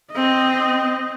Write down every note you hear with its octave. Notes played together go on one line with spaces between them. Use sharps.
C4 D#5